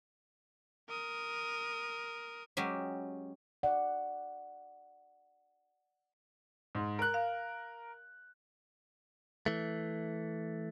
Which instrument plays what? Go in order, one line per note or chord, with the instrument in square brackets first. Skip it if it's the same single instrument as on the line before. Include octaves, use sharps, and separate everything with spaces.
[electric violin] A#4 D#6
[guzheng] F#3 G#3 C#4 G4
[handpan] D5 F#5
[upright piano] G#2
A#4 F#6
[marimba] F5
[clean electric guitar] E3 A3